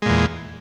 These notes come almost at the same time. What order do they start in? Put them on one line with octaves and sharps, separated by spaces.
G#3 A#2 E2